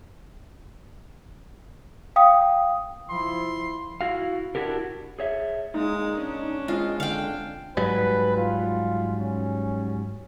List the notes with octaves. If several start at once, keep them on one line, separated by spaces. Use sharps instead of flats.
F5 G5 D#6
F3 E4 C6
E4 F#4 F5
D4 E4 F#4 G4 A#4
G#4 C#5 E5
A#2 G#3 D#4 D#6
C#4 D4
G#3 C4 F4 D#5
D3 D4 F5 G5
G#2 F#3 G3 B4
F4
C#4